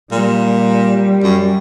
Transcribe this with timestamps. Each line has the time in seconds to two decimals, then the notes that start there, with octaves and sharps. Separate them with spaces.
0.11 A#2 G3
1.23 F#2